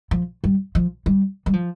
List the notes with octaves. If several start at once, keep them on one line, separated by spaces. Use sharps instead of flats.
F3
G3
F3
G3
G3
F3